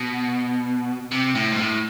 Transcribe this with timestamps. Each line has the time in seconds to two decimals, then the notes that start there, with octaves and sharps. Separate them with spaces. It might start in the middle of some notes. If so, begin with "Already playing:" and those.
Already playing: B2
1.12 C3
1.35 A2
1.52 G#2
1.59 A2